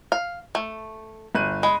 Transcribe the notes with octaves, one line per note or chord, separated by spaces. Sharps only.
F5
A3
G1 F#6 D#7
G#3 B5